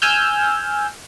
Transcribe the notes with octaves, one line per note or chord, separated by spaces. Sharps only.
G#5 E6 F6 G6